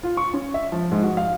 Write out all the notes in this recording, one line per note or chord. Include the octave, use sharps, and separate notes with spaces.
F4
C#6
C#4
E5
F3
G#2
F#4
F5